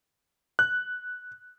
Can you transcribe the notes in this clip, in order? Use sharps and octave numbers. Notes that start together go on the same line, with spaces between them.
F#6